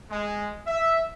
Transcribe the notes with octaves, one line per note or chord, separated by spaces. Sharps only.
G#3
E5